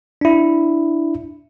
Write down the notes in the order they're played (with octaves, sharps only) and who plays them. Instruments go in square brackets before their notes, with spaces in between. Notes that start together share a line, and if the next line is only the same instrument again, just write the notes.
[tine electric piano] D4 E4